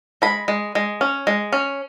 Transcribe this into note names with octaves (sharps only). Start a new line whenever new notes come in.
G#3 B5
G#3
G#3
C#4
G#3
C#4